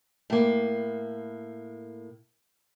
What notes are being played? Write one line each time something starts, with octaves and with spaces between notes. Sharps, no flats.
A2 A#3